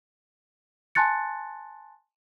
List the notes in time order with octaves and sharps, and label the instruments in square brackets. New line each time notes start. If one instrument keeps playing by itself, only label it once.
[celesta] G#5 A5 C6 F#6 A6 C#7